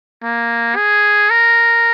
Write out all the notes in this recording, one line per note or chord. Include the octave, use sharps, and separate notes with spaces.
A#3
G#4
A#4